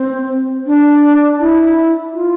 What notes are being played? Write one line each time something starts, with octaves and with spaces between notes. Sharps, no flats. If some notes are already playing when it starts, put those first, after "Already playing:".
Already playing: C4
D4
E4
F4